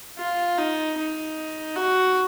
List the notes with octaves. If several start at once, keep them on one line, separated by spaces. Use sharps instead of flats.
F4
D#4
D#4
F#4